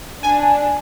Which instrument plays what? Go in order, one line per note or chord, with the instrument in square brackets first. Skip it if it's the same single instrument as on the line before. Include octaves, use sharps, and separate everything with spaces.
[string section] D4 [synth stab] G#5